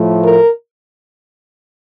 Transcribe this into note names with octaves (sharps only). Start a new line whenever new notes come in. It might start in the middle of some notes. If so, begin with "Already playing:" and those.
Already playing: A2 F3 A3
A#4